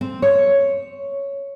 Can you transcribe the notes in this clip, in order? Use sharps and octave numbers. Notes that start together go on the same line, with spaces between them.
C4
C#5